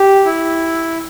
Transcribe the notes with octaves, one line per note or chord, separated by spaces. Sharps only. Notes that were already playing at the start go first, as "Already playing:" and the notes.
Already playing: G4
E4